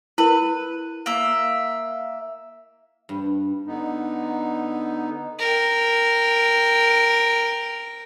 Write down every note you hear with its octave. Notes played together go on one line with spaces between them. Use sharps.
E4 A#4 B4
A#3 E5
G2
D3 B3 D#4
A#4 G5